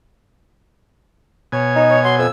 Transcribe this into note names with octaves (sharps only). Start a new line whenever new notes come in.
B2 C#5 G#5
D#4
C#5
F#3 C6
F2 E6